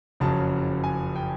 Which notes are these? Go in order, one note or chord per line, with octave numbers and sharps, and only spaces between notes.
F#1 F2 C#3 F#3 A5
G#5
G5